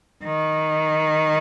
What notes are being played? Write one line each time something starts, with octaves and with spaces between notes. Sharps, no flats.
D#3